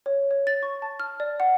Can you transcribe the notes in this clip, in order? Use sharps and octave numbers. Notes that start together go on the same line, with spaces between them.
C#5
C#5
A6
C#6
A5
F6
D5
F#5